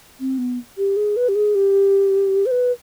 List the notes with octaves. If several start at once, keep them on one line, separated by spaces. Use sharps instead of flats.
C4
B3
G4
G#4
B4
G4
G#4
G4
C5
B4